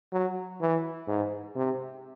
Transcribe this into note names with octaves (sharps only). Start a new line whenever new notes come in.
F#3
E3
G#2
C3